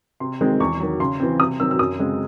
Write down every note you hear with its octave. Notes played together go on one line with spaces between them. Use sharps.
C3 C6
D#3 G#3 C4
E2 C#6
D#3 F#3
C#3 C6
E3 C4
C3 D#6
D#3 F#3 C4 E6
E6
F#2 D#6
C#3 G#3 C4